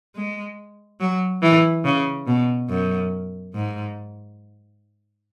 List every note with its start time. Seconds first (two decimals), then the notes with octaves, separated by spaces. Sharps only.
0.15 G#3
1.01 F#3
1.42 E3
1.85 C#3
2.27 B2
2.69 F#2
3.55 G#2